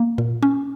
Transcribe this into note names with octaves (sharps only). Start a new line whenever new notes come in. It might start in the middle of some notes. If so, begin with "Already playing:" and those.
Already playing: A#3
A#2
C#4